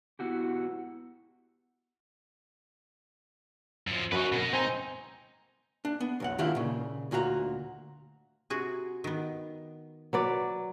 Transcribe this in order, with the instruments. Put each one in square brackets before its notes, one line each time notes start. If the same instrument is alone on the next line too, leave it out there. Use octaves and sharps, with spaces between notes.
[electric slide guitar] B3 E4 F#4 G4
[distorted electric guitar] F#2 F3
[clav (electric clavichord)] F#2 F#4 [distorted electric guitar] D#4 B4
[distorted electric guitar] B2 D#5
[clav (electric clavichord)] C4 G#5 A#5 [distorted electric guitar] D#4
[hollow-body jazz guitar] D4
B3
B1 F2 F#5
D#3 D4 E4 F4 G4
A#2 C#3
D2 A#2 F#4 A4 A#5
[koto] C3 F#4 G#4
D#3 B3
[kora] F#3 B4 D5